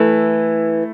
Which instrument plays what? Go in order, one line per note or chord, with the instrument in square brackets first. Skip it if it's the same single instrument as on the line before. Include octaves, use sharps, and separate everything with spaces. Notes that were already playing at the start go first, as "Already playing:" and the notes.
Already playing: [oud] E3 [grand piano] A3 E4